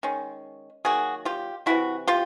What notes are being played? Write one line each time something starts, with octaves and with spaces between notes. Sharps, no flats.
D#3 G#3 C#4
D#3 F#3 A#3 F#4 G#4
F4 G4
C3 E3 G#3 E4 F#4
F4 G4